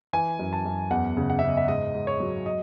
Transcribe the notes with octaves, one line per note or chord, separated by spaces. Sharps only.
E3 G#5
F#2
A5
F#2
E2 F#5
C#3
F#5
C#3 E5
D#5
E5
G#2 D#5
G#2
C#5
F#3
D#5